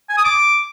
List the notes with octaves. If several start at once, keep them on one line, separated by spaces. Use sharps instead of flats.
G#5
D#6
D6